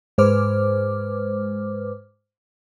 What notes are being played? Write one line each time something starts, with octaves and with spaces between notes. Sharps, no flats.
G#2 G#3 B4 C5 D6 F6